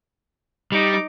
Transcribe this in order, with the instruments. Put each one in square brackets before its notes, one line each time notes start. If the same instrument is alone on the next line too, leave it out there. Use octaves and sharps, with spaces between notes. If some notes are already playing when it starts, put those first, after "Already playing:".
[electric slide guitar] G3 [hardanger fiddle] D#4 D6